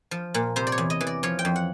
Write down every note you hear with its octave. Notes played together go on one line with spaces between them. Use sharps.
F3
A#2
C3 C5
D5
C#5
E2
D#5
E3
D5
F3 C#5
G5
F2
F#5